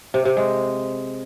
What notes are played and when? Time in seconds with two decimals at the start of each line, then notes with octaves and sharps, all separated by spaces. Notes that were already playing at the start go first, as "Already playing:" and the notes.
0.14 C3
0.25 C3
0.37 G#3